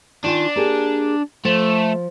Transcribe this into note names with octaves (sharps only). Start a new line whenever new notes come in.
D#3 D4 F4 G#5
A#3 G4 G#4
F3 A3